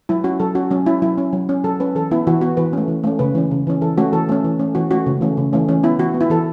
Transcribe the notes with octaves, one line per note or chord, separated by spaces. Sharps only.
F#3 E4
C#4 F#4
F#3 A4
C#4 F#4
F#3 C#4
C#4 E4
F#3 E4
C#4
F#3
C#4
F#3 A4
C#4 B4
E3 A4
B3 E4
E3 F#4
B3 F#4
E3 B4
A3 C#4
E3
A3 C#4
C#3 B4
E3 C#4
C#3
E3 C#4
E3 A4
A3 C#4 F#4
E3 A4
A3 C#4
E3
A3 C#4
E3 F#4
A3 C#4 F#4
C#3
E3 A3 C#4
C#3
E3 A3 C#4
E3 C#4
B3 E4
E3 F#4
B3
E4
E3 A4